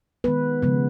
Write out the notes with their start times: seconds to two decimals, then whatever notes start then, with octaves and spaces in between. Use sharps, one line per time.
0.24 D#3 G#3 B3 B4
0.62 C#3 F3 G#3 B3